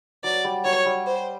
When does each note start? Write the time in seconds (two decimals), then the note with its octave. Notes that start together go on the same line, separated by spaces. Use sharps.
0.24 F#3 D5
0.44 G3
0.64 F#3 C#5
0.86 G3
1.06 C5